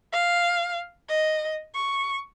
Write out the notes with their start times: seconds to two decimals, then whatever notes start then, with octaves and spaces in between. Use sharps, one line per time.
0.13 F5
1.09 D#5
1.74 C#6